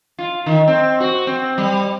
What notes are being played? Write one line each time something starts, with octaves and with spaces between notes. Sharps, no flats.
F4
D#3
C4
F#4
C4
G3